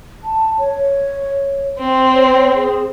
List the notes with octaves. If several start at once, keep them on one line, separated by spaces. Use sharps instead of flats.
A5
C#5
C4
C#5
G#4